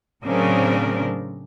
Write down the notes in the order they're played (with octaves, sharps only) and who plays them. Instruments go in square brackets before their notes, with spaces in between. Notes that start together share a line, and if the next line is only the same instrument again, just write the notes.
[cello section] A2 C#3 F#3 C4 D4 A#4